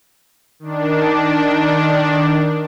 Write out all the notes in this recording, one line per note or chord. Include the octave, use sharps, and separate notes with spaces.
D#3 D4